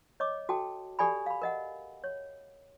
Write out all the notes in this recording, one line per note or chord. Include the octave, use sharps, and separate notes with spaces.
C#5 D#5 D6
F#4 A4 G5 A5
G4 A4 D5 G#5 B5
F5 B5
A#4 D#5 F#5
C#5